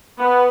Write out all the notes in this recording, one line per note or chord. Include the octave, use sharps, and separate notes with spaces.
B3